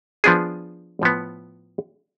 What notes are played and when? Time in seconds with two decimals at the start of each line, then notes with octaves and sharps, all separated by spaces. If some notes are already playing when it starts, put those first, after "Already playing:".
0.24 F3 B3 D4 G#4
1.02 A2 F3 B3